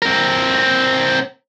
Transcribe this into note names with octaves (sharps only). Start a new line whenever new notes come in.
C4 A#4